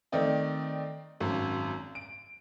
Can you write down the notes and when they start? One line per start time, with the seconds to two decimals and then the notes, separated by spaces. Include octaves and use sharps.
0.12 D#3 A3 C4 D5 D#5
1.20 G#1 F#2
1.95 D7